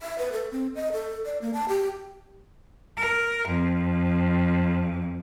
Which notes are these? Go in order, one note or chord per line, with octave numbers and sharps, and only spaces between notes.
E5
B4
A4
C4
D#5
A4
D5
A#3
A5
G4
A#4
F2